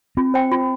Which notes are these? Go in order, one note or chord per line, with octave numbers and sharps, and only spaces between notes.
C4 F4
C5 G5
F4